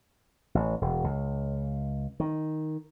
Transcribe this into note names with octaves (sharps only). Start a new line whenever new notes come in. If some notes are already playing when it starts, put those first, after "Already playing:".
A1
E1
C#2
D#3